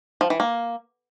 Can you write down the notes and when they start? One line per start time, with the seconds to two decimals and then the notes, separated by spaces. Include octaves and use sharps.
0.21 F3
0.30 E3
0.40 A#3